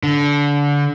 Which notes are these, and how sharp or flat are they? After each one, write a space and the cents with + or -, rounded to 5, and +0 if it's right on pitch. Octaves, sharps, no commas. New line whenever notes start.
D3 -25